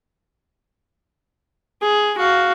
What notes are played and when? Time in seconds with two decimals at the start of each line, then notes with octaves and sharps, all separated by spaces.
1.82 G#4
2.18 F#4 F5